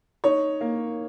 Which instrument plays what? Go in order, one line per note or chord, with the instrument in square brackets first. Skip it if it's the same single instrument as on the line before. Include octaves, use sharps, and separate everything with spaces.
[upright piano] D#4 C#5
A#3